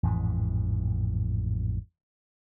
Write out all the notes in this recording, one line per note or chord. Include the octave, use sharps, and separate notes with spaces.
A1 F2 G#2 E3